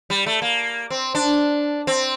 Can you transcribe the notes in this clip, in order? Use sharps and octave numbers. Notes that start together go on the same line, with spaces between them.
G3
A3
A#3
C4
D4
C4